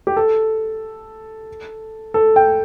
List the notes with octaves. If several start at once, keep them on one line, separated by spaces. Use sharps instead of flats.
G4
A4
A4
G5